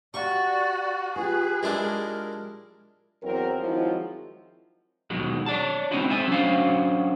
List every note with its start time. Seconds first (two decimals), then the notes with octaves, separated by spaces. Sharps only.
0.14 F#4 G4 D5 F5 C#6
1.16 F4 G4 G#4 B4
1.63 G#3 D4 E4 A#4
3.22 E2 F#3 C4 A#4
3.58 D#3 F3 F#3 G#3 C4 E4
5.10 D#2 B2 D#3 F#3 G#3
5.46 C#5 D5 A5
5.91 G#3 C4 C#4 D#4 E4 F#4
6.09 C4 E5 G#5
6.28 F#3 C#4 D4 F#4 C5 F5